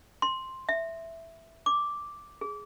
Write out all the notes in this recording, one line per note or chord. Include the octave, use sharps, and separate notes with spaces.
C6
E5
D6
G#4